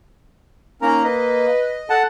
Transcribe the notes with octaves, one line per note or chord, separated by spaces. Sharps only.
A#3 C#4 D#4 A#4 A#5
B4 D#5
A4 F#5 A5